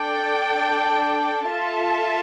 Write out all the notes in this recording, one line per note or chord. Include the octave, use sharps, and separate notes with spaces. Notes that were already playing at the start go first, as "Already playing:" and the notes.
Already playing: D4 A4 D5 G5
F4 A4 E5 A5